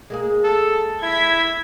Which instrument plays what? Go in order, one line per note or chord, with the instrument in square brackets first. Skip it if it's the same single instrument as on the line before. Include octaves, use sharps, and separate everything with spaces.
[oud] G#3 A#3 G#4
[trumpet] A4
[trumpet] E4 [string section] G#6 B6